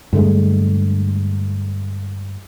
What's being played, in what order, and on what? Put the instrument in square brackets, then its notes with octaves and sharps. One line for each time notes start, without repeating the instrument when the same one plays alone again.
[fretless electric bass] G2 D3 G#3 A3